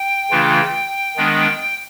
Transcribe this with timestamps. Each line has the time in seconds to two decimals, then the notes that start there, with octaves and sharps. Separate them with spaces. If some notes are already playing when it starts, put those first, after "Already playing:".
Already playing: G5
0.31 C#3 E3 A3 D4 F4
1.17 D#3 G#3 B3 D4